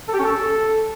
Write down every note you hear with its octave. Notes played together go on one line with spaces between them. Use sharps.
A4
G4
C#4
A4